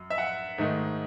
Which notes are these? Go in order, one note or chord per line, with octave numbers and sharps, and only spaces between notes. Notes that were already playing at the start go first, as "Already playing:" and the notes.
Already playing: F#2
E5
F#5
G#2 D#3 A3 D#4